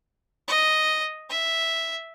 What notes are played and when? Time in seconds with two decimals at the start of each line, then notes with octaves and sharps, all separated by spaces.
0.48 D#5
1.30 E5